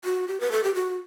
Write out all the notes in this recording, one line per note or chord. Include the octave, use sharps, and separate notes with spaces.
F#4
G4
B4
A4
G4
F#4